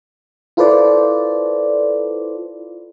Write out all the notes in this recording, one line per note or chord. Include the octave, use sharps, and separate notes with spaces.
E4 F4 A4 B4 C5 D5